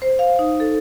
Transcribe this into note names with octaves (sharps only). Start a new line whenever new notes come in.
C5
F5
D#4
A4